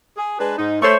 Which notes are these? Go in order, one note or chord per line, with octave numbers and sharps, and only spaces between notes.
G#4
G#3 D4 B4
G#2 D#4
A3 C5 C#5 C#6